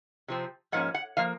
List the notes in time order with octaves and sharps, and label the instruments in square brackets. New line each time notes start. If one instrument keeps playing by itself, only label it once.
[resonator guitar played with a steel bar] C3 F3 C4
G#2 F3 A#3 C#4 F#5
F#5
F3 A#3 F5